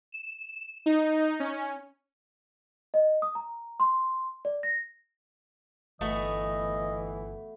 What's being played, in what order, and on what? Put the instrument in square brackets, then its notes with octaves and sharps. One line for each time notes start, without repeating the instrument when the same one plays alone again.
[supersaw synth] E7
D#4
C#4
[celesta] D#5
D#6
A#5
C6
D5
A#6
[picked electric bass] G1 [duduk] E3 [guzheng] A3 B3 F#4 [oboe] D#5